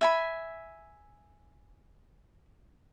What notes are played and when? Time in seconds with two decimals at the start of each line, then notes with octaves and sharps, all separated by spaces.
0.01 E5 G#5 B5